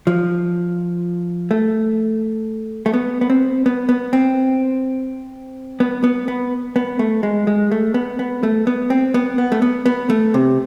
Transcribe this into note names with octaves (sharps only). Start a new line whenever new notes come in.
F3
A3
A3
B3
B3
C4
B3
B3
C4
B3
B3
B3
B3
A3
G#3
G#3
A3
B3
B3
A3
B3
C4
B3
B3
A3
B3
B3
A3
C3